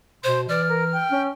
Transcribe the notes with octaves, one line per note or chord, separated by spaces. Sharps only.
B2 C5 C6
E3 D5 F6
A#4
G5
C#4